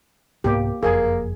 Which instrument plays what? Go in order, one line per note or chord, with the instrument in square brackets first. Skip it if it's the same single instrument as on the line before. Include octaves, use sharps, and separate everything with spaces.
[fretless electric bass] C2 G#2 B3 [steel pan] A#3 G4
[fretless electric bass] F#1 F2 [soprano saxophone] A#3 [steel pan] G#4 G#5